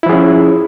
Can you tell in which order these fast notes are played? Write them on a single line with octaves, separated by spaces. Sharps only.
E4 F3 G#4 C#4